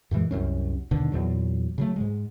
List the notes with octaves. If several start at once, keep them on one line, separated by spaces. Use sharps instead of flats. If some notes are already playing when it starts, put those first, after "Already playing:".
F#2 A#2 E3 G#3
C2 F#2 C#4
D#2 B2 D3 D#3
E2 A#2 F#3
C#3 F#3 A3
G#2 G#3